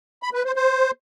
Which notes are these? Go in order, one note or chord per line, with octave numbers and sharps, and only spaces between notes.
B5
B4
C5
C5